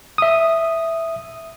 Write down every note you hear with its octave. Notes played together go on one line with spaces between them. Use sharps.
E5 D#6